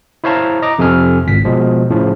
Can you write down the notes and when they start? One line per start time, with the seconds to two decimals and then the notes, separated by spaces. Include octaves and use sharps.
0.24 E4 C5 C#5 F5 A5 A#5
0.62 D#5 A#5 D6
0.79 F2 C3 F3 A4 G#5 F6
1.26 G#1 C#2 B6
1.45 B2 F3 G#3
1.90 A2 C#3 F3